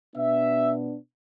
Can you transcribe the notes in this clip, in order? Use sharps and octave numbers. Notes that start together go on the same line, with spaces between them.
B2 B3 D4 E5